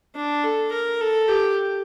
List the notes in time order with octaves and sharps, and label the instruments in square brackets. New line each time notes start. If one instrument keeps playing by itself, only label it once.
[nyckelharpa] D4
A4
A#4
A4
G4